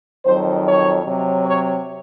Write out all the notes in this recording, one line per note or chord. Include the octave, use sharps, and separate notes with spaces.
F2 D#3 F#3 C5
C#5
C3 F#3
C#5